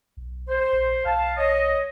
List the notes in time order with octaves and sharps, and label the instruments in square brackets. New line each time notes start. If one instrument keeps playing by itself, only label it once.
[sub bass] B1
[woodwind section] C5
[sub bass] A#1
[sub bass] B1 [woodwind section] F5 A5
[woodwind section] C#5 D#5